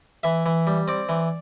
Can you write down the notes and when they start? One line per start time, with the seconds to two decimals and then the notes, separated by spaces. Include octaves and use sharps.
0.23 E3 E5
0.46 E3
0.67 G3
0.88 C4 D5
1.09 E3